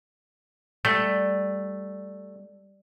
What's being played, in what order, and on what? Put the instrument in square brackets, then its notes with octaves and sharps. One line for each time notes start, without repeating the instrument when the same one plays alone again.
[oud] G3 [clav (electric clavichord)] A3